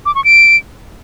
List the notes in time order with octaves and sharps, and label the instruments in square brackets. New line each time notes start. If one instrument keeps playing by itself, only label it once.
[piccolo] D6
C#6
D7